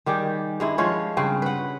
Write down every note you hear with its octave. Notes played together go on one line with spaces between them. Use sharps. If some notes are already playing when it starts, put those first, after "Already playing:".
D#3 G3 G4 G#4
G2 G#3 E4
F3 G#3 F4 C#5
G2 C#3 C4
B4 F#5